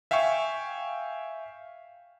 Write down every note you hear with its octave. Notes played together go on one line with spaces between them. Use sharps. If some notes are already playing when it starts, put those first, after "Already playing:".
E5 F5 G5 G#5 C#6